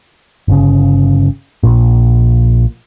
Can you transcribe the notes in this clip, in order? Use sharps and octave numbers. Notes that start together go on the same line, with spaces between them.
G1 C#3
A#1 A#2